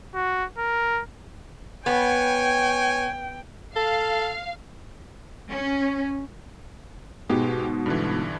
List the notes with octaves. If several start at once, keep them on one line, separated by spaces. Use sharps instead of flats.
F#4
A#4
B3 C#5 G5 G#5
A4 F5
C#4
G#2 B2 G#3 B3 G4
G2 D3 E3